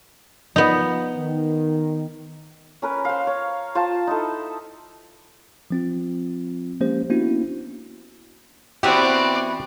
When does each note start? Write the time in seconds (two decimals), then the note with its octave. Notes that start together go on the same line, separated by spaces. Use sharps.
0.56 F3 B3 D#4
1.16 D#3
2.82 C#4 A#4 B4
3.05 C5 F5
3.27 C#5
3.75 F4 C5 F5 A5
4.07 D#4 E4 A4
5.70 F3 C4 F4
6.80 F3 G#3 A#3 C#4 G4 C5
7.10 A#3 B3 C#4 D4 E4 F#4
8.83 E3 B3 C4 F#4 G4 D5